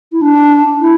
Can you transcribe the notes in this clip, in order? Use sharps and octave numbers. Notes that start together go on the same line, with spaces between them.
E4
D4
E4